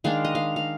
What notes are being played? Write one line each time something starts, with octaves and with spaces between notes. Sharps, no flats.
D#3 G#3 D4 F5
D#5
F5
F5